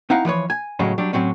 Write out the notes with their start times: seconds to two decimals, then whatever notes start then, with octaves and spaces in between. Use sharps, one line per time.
0.10 C4 D#4 E4 F5 F#5
0.25 E3 F3 B4 C#5
0.50 G#5
0.79 A2 C#3 F#3 G#3 C#4
0.98 F#3 G3 D4
1.13 A2 F#3 C4 C#4